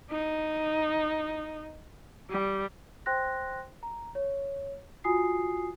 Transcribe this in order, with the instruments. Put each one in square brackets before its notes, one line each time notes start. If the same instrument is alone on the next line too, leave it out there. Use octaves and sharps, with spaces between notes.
[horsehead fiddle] D#4
G3
[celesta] C5 G5 C6 F#6 A#6
A#5
C#5
F4 F#4 G#5 D#6 C7